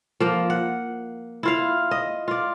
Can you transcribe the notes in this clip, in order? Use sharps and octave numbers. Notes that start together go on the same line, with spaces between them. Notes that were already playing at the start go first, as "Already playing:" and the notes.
F3 A#3
F#5
E4 F4 F5
D#5
F4 D5